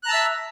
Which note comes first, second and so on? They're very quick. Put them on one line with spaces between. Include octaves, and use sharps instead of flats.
F#6 A#5 A5 E6 E5